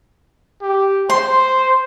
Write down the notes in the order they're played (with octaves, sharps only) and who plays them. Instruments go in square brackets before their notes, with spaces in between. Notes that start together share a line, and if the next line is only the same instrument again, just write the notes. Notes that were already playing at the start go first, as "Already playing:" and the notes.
[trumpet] G4
[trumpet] C5 [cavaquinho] C6